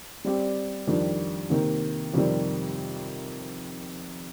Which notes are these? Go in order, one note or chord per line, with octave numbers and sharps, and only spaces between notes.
G3 C4 G4 D5
F2 D#3 G3 D4
C3 D#3 A#3
F2 C3 D#3 G3